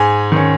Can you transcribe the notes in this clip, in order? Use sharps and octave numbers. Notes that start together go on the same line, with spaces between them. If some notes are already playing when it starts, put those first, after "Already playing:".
Already playing: G#2 G#5
D#3 C#4